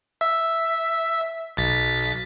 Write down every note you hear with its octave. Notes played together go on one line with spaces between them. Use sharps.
E5
B1 A6 B6